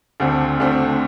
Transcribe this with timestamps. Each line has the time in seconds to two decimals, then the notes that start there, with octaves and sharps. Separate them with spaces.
0.20 D2 D3 A3 C4
0.60 D2 D3 A3 C4